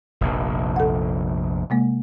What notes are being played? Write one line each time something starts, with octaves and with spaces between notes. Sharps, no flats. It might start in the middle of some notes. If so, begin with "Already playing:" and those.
F1 A#1
A4 F#5
C3 G#3 A#3